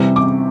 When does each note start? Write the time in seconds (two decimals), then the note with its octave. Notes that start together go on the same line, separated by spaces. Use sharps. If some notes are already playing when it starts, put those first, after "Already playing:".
Already playing: C3 E3 G3 C4
0.16 D6